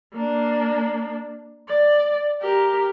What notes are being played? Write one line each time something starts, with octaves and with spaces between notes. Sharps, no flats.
A#3 D4
D5
G4 A#4